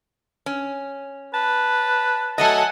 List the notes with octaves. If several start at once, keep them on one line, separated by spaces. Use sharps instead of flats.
C#4
B4 A5
F#3 A3 A4 D#5 F#5 G#5